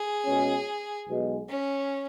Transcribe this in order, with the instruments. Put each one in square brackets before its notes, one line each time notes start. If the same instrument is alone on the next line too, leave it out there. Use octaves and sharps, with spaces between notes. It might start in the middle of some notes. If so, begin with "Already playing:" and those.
Already playing: [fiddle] G#4
[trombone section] B2 G#3 C#4
B1 B2 G#3
[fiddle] C#4